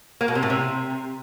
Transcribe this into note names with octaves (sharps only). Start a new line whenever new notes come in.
A#3
B2
C3
A2
C3